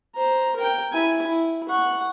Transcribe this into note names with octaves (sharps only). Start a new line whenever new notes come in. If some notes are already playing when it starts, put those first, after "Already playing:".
C5 A#5
A#4 G5
E4 G#5
E4
F#5 C#6